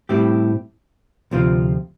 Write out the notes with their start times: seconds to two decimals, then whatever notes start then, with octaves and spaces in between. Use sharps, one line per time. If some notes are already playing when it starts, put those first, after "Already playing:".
0.09 A2 G3 C4 E4 G4
1.31 D2 C3 F3 C4 F4